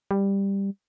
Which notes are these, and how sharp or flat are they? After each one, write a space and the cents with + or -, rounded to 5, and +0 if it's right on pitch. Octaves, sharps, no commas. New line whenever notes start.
G3 +10